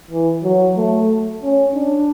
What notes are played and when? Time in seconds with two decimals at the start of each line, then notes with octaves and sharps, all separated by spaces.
0.11 E3
0.43 F#3
0.77 A3
1.43 C#4
1.75 D4